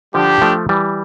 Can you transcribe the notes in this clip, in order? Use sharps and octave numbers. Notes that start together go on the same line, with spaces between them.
D3 F3 G3 D4 G4
F3 A3
E3 G3